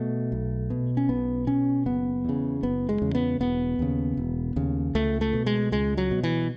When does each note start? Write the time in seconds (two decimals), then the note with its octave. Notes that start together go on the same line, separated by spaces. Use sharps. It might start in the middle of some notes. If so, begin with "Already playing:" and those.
Already playing: B2 A3
0.32 B1
0.70 B2
0.97 C#4
1.09 B1 B3
1.47 B2 C#4
1.86 F#1 B3
2.25 E2 C#3
2.63 F#1 B3
2.89 G#3
3.02 E2 C#3
3.15 B3
3.40 E1 B3
3.79 D#2 C#3
4.17 E1
4.56 D#2 C#3
4.95 C#2 A3
5.21 A3
5.33 B2
5.46 G#3
5.72 C#2 G#3
5.97 F#3
6.11 B2
6.23 E3